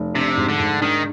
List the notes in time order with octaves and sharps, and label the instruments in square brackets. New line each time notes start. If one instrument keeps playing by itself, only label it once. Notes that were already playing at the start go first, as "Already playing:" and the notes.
Already playing: [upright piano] F1
[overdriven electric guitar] C3 [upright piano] D4
[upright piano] G#2
[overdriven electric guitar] D3
[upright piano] G#2
[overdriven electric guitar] D#3 [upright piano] D4